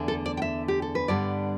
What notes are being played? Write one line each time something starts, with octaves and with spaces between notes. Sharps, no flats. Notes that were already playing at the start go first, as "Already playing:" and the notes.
Already playing: E2 D3 A3
A4
D5
G5
E5
G4
A4
B4
G2 D3 G3 B3 D5